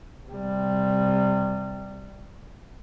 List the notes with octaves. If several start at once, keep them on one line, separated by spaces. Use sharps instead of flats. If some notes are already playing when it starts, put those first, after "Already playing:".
C3 G3